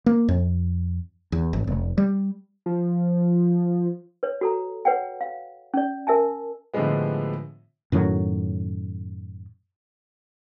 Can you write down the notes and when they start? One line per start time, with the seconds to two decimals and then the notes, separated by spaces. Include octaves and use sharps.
0.06 A#3
0.28 F2
1.32 E2
1.53 G#1
1.67 F1
1.98 G3
2.66 F3
4.23 B4 C#5
4.41 F#4 A4 A#5
4.85 B4 C#5 F#5 G5
5.21 F5
5.74 C#4 D5
6.07 A#4 E5 G#5 A5
6.74 A2 D3 F3 G3 G#3 B3
7.92 F#2 A2 D#3 F#3